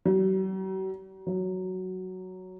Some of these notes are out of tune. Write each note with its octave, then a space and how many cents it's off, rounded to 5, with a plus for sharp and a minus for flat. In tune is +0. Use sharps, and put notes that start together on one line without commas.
F#3 +45
F#3 +5